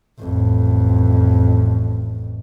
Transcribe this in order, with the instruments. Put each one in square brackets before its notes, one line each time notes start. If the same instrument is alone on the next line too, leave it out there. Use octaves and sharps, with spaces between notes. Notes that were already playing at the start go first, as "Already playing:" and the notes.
[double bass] A1 F2